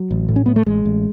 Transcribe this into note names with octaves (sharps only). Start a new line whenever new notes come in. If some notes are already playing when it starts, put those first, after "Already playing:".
Already playing: F#3
A1
A2
C#4
A2 B3
A3
A1 G#3
A1